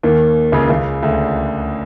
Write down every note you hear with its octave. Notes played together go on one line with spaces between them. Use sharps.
D#2 D#3
C#2 C#3
C#2 C#3
D2 D3